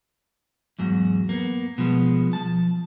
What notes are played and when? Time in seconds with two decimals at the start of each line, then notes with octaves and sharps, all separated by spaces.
0.79 E2 G#2 F#3
1.29 A#3 B3
1.78 B2 F3 G#3 B3
2.33 F3 A5